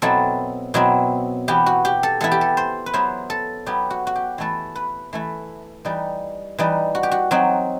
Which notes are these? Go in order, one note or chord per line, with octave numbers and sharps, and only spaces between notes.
B2 F#3 C4 E4 A4
B2 F#3 C4 E4
E3 B3 E4 G4
F#4
G4
A4
E3 B3 E4 A4
G4
A4
C5
B4
F#3 B3 E4 C5
A4
F#3 B3 E4 G4
F#4
F#4
G4
E3 A3 E4 A4
B4
E3 A3 E4
E3 G3 D#4
E3 G3 D#4
F#4
G4
F#4
F#3 C4 D#4 F#4